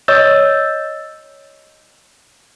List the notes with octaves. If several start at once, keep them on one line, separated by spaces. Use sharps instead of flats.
C#5 D#5 E6 G6 A6